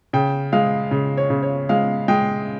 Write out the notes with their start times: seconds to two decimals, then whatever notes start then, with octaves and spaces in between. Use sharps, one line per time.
0.13 C#3 G5
0.53 G#3 F5
0.91 C#3
1.18 C#5
1.30 C#3
1.43 C#5
1.69 G#3 F5
2.08 G#3 G5